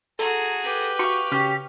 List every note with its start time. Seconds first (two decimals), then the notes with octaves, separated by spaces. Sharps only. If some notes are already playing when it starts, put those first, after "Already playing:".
0.19 F#4 G#4 A4 A#5
0.63 G4 B4
0.99 F#4 F5 C#6
1.32 C#3 C#4 G4